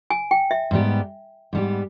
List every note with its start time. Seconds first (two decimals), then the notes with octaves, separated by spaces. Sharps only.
0.10 G#5
0.31 G5
0.51 E5
0.71 G#2 G3 B3 G4
1.53 G#2 G3 B3 G4